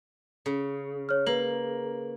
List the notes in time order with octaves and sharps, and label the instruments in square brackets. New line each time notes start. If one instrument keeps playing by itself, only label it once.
[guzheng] C#3
[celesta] C#5 F6
[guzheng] A#3 [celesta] B4 F#7